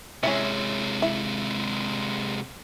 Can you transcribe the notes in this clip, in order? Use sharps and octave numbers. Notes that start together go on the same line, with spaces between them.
C3 G#3 C#4 E4 E5
E4